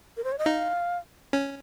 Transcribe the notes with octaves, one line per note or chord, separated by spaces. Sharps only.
A#4
C5
C#5
D#5
D#4 F5
C#4